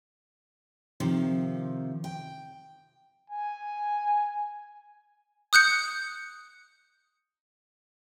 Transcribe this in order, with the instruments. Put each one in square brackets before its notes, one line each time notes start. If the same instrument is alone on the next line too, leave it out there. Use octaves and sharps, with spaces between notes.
[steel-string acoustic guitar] C3 D#3 F3
G5
[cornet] G#5
[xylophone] D#6 F#6 G6 C#7